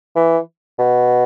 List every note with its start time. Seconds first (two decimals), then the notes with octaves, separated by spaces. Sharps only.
0.16 E3
0.79 B2